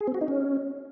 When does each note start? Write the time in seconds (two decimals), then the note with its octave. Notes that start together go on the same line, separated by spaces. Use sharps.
0.01 G#4
0.07 C4
0.14 F#4
0.21 D#4
0.28 C#4